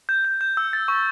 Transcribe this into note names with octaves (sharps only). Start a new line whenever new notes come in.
G6
G6
G6
E6
A6
C#6